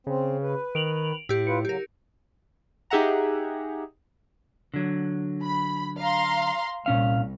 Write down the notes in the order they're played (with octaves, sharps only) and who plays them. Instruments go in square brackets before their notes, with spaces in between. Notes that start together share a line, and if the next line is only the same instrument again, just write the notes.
[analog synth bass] C#3 [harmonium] C4
[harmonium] B4
[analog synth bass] D#3 [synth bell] D7 F7 F#7
[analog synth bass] A2 [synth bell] E4 G4
[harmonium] F4 B4 [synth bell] C#7
[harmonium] C#3 F#3 [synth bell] G4 A#4
[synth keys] D#4 G4 G#4 E5 F#5 A#5
[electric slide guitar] D3 F#3
[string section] B5
F5 A#5 C6
[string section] C2 [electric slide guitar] A#2 C#4 F5